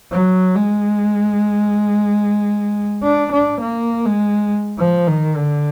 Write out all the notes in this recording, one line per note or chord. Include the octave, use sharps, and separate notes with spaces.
F#3
G#3
D4
D4
A#3
G#3
F3
D#3
D3